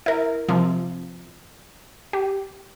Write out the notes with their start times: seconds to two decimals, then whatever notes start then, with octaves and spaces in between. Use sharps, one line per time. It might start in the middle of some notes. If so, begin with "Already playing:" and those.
0.06 E4 A#4
0.49 C3 F3
2.13 G4